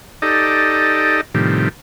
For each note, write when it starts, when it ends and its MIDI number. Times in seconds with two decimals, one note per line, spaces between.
0.22 1.21 63
0.22 1.21 67
0.22 1.21 69
0.22 1.21 74
0.22 1.21 75
1.34 1.69 45
1.34 1.69 48
1.34 1.69 51
1.34 1.69 53
1.34 1.69 55